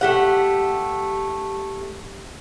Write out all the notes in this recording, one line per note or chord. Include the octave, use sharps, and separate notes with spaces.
A3 G4 F#5